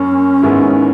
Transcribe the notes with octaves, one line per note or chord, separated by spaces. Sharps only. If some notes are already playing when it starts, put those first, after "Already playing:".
Already playing: F#2 A#3 C#4
G#2 D#3 G#3 B3 E4